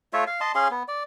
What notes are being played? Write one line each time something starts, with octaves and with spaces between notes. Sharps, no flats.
A3 F4 C#5 E5
F5
D#5 A5 C6
C#4 G#4 F5 C6
B3
D5